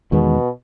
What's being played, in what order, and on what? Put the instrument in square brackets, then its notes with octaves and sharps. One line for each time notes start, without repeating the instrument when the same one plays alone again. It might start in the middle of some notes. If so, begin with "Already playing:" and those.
[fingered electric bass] E2 D#3 G#3 B3 [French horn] B2